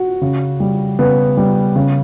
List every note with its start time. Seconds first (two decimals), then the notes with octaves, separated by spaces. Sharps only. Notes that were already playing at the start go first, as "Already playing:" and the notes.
Already playing: F#4
0.22 C#3
0.60 G3
0.99 C#3 B3
1.37 G3
1.76 C#3